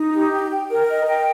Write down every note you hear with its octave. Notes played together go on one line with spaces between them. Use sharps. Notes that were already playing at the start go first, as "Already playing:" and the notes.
Already playing: D#4
G4
G5
G5
A#4
D#5
G5